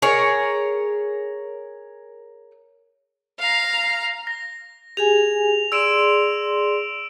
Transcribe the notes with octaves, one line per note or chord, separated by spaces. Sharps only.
G#4 A#4 C#5
F5 A#5
A#6
G4 G#4 G#5 F7
G#4 D5 C6 E6 D7 E7